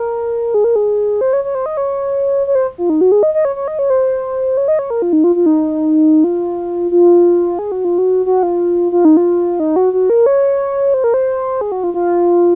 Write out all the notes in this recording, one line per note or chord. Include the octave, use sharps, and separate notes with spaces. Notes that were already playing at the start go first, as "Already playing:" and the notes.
Already playing: A#4
G#4
A#4
G#4
C5
C#5
C#5
C5
D#5
C#5
C#5
C5
F4
D#4
F#4
G#4
D#5
D#5
C#5
C#5
D#5
C#5
C5
C#5
D#5
C#5
A#4
F4
D#4
F4
F4
D#4
F4
F4
G#4
F#4
F4
F#4
F#4
F4
F4
D#4
F4
D#4
F#4
F#4
A#4
C#5
C5
A#4
C5
G#4
F#4
F4
F4